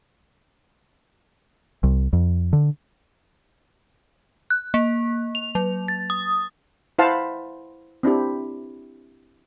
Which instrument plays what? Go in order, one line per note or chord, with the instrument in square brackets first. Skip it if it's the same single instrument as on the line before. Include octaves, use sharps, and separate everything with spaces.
[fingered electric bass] C2
F2
D3
[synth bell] F#6
A#3
F7
F#3
A6
D#6
[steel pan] E4 C5 F5 F#5 A5
C4 D4 E4 G4